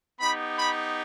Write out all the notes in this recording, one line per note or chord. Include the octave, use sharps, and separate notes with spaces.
B3 D#4 G4 B5
B5